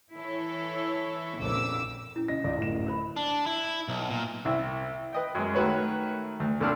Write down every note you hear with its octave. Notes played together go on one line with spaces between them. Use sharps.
E3 E4 A4 C#5
A#1 F2 C#3 D6 E6
C#4 E4
C#3 D#5 A#6
C#2 D#4 D5
D1 F#2 E7
A#4 C5 B5
D4
E4
B1
A#2
C2 E4 E5
B4 D#5 G5
F#2 G#3
D#3 A3 F#4 B4 C#5
D2
B1 D3 C4 D4 A5 F6